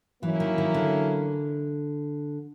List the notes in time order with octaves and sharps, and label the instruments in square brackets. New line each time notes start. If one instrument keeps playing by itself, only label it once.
[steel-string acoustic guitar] E3 [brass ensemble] F#3 A#3 C#4 E4
[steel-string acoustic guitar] D#3
D#3
D3